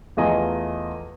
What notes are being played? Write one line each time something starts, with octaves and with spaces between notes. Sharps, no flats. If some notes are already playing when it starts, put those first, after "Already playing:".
E2 A3 F4 D#5 G#5 A#5